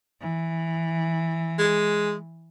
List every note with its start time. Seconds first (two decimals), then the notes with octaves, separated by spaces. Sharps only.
0.21 E3
1.59 G#3